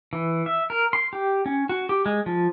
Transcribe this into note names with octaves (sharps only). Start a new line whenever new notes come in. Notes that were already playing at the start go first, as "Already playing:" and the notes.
E3
E5
A#4
C6
G4
C#4
F#4
G4
G#3
F3